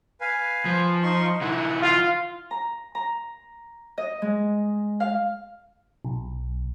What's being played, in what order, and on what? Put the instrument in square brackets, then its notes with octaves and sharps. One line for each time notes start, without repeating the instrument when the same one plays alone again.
[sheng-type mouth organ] B4 F5 G#5
[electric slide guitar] F3
[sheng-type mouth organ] D#4 C6 C#6
[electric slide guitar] E3 D#4 E4 [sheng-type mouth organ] F#5
[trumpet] F4
[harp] A#5
A#5
D#5
G#3
F5
[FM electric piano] B1